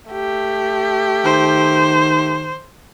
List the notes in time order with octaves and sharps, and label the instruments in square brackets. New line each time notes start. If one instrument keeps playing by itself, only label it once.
[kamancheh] A3 G4
[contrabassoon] D#3 [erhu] C5